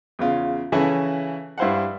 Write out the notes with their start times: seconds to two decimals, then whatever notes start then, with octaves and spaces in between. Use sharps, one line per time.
0.19 E2 C#3 F4
0.72 C#3 E3 C#4 E4 A4
1.58 G2 E4 C5 F5 F#5